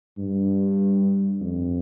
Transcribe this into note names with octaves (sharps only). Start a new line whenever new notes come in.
G2
F2